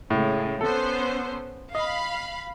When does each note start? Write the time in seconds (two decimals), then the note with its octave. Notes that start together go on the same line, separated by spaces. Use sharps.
0.10 A2 C#3 G#3
0.61 B3 C#4 A4 C5
1.75 D#5 F5 B5